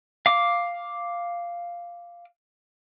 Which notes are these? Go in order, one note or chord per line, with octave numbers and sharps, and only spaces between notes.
F5 D6